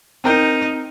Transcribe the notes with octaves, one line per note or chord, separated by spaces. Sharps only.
C4 D#4 A#4 G6